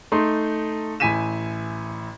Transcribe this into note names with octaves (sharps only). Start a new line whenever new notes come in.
A3 D#4 C6
A1 E4 G#5 B6 D#7 E7